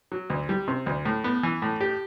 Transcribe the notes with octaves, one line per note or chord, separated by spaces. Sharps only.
F#3
D2
G3
C3
D2
A2
B3
E3
A2
G4